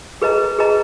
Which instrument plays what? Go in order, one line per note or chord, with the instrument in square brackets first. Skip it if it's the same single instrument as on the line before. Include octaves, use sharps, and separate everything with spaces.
[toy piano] G#4 B4 D#5 A#5
G#4 B4 D#5 A#5